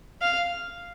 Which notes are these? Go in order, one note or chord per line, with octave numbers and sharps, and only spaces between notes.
F5